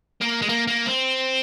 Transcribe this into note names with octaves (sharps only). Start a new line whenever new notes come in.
A#3
G#3
A#3
A#3
C4